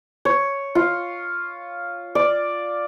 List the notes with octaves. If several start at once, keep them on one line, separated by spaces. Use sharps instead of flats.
C#5
F4
D5